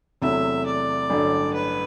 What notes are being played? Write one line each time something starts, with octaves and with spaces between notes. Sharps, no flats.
E2 C3 F#3 A3 E4 E5
D5
A1 G2 D3 F#3 A3
B4